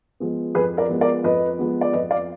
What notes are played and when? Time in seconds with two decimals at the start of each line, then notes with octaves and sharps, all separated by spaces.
0.20 F3 G#3 B3
0.55 F2 G#4 B4
0.77 A#4 D5
0.89 F3 G#3 B3
1.01 A#4 D5
1.24 F2 B4 D#5
1.59 F3 G#3 B3
1.81 D5
1.93 F2 B4 D#5
2.11 D5 F5